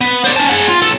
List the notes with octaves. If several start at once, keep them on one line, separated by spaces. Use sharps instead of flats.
B3
C5 D5
C#4 A5
G#4 F#5
F4
B1 A4